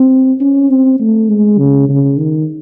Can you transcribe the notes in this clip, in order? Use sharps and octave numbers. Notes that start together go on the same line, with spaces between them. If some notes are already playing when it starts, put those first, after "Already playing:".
Already playing: C4
C#4
C4
A3
G#3
C#3
C#3
D#3